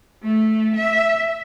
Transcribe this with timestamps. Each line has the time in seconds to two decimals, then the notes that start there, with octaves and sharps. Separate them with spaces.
0.23 A3
0.76 E5